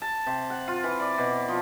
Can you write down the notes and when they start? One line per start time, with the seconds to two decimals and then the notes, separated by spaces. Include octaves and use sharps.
0.02 A5
0.26 C3
0.50 F#5
0.68 F4
0.84 E3
1.00 D5
1.18 B2
1.48 F3